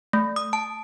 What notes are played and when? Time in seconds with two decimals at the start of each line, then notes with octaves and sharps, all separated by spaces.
0.13 A3
0.36 D#6
0.53 A5